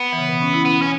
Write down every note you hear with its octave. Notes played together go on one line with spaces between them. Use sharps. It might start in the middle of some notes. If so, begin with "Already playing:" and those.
Already playing: B3
E3
C#3
B2
C#4
E4
B3 E4
C#4